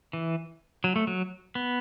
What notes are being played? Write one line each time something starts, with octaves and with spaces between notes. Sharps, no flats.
E3
F#3
A3
F#3
B3